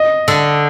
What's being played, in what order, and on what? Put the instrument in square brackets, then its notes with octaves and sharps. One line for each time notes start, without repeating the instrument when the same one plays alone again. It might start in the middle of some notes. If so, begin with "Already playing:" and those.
Already playing: [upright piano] D#5
[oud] D3